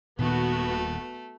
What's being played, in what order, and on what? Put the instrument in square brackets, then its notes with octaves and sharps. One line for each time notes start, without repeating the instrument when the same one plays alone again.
[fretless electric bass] D#1 A#2 D#3 [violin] A3 [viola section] B3 F#4